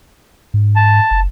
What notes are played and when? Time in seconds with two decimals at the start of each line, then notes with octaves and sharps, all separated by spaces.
0.54 G#2
0.76 A5
1.11 F#1